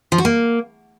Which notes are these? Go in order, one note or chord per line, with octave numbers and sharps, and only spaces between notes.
F3
F#4
A#3